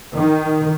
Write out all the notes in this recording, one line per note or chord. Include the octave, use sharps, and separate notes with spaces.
D#3